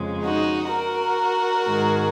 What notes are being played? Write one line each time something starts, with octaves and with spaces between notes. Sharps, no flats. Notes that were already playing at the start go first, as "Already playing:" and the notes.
Already playing: F2 C#3 G#3
D#4 F#4
F#4 A#4
G#2 D#3 G#3